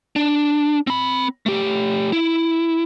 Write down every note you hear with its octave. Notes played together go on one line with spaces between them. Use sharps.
D4
C4 B5
A3 G4
E4